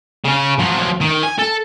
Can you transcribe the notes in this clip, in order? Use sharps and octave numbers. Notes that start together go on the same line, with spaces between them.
C#3 C#4
F3 F#3
D#3
G#5
A4